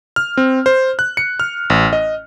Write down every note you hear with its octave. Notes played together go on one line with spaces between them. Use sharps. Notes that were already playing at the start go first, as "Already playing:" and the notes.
F6
C4
C5
F#6
C#7
F6
A1
D#5